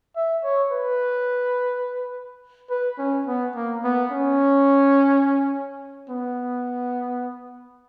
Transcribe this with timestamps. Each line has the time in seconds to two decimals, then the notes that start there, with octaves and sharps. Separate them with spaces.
0.16 E5
0.43 C#5
0.72 B4
2.70 B4
2.98 C#4
3.27 B3
3.55 A#3
3.84 B3
4.11 C#4
6.09 B3